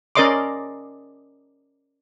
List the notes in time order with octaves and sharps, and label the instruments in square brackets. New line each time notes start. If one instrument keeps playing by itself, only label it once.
[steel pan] C#4 A#4 D5 D#5 C6 D6